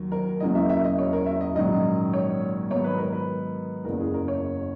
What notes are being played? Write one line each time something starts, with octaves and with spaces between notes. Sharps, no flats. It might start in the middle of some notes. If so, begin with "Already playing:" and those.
Already playing: D#2 D#3 F#3
A#4
E1 E2 C#3 F#3 A#3 D#5
E5
E5
D#5
C#5
A#4
E5
D#5
A#1 G#2 D#3 F#3 C#4 D#5
C#5
G#2 D#3 F#3 B3 D#4 C#5
B4
A#4
B4
F#1 E2 C#3 A#4
G#4
A#4
C#5